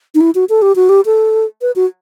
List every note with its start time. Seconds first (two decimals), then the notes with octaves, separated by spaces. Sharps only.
0.15 D#4
0.21 E4
0.35 F#4
0.49 A4
0.62 G4
0.76 F#4
0.89 G4
1.06 A4
1.62 B4
1.76 F#4